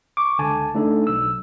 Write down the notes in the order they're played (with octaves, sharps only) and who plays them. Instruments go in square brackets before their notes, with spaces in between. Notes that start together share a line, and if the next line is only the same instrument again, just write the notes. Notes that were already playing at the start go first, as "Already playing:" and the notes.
[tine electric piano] C#6 D6
C#2 D3 G#5 A5
A3 D4 D#4 A4
B1 E6